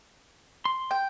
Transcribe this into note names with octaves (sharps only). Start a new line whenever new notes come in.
C6
G5